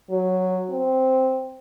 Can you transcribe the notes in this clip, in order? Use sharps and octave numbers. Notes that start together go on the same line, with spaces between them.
F#3
C4